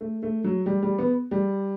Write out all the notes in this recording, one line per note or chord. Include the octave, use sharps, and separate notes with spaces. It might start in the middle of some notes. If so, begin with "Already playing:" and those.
A3
A3
F#3
G3
G3
B3
G3